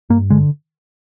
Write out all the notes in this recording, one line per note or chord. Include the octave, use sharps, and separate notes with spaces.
G2 A#3
D3 G#3